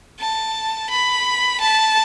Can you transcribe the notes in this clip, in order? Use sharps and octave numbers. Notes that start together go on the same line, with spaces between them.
A5
B5
A5